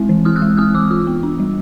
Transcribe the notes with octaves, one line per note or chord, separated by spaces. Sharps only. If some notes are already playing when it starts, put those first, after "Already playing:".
Already playing: G#3 C4 E4
E3
E4 D#6 F6
E6 F#6
G#3
C4 D#6 F6
E3 D6 E6
F4 D6 E6
B3
D4
G3